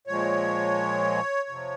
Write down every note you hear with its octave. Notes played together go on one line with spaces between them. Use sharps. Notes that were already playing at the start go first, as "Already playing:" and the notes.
A#2 F3 G#3 C#5
F2 C3 F3